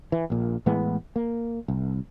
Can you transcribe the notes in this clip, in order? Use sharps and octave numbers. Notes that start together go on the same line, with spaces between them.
E3
A#1 A#2
A2 E3 G#3 B3
A#3
C2